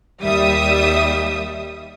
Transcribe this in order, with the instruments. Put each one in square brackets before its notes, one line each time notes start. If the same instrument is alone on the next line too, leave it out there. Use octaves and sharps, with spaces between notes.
[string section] D#2 G3 E5 D#6